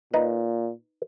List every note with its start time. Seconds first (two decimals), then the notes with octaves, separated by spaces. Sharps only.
0.14 A#2 D#4 B4